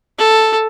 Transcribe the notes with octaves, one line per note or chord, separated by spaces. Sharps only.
A4